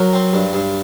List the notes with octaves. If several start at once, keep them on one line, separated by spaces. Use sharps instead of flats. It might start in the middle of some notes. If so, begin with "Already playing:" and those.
Already playing: F#3 A#4
C4
G2
G2